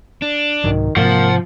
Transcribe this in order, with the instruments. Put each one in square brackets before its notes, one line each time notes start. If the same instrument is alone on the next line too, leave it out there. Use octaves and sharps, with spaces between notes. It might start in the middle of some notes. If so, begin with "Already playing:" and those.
[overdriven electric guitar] D4
[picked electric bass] C2 G#2 F#3 [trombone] D#3
[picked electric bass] G#2 C3 [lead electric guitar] F3 [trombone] A#3 [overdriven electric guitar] F#5